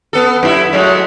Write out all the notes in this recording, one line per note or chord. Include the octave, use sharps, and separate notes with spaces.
B3 A4
F#2 E4
F#3 G#3 A3